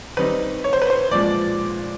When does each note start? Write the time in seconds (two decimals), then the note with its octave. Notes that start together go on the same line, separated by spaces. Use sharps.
0.17 D#3 G3 C4 D#4 B4
0.64 C#5
0.73 C5
0.82 B4
0.90 C5
1.11 A#2 F3 G#3 D5